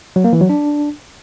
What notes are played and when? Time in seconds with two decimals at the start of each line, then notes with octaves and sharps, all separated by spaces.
0.16 F#3
0.24 A#3
0.33 E3
0.41 F#3
0.49 D4